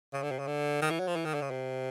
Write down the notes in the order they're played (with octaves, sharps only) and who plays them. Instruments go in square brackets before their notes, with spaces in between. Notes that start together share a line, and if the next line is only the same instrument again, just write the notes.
[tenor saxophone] C#3
D3
C3
C#3
D3
D#3
E3
F#3
F3
E3
D#3
D3
C#3
C3